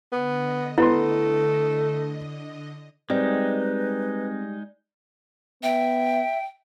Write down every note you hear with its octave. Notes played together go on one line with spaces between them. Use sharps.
D3 B3 D#5
A3 B3 E4 C6
G3 G#3 C4 D#4 B4
B3 E5 G5